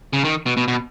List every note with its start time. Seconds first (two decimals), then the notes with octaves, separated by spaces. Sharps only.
0.13 C#3
0.24 D#3
0.46 B2
0.57 B2
0.68 B2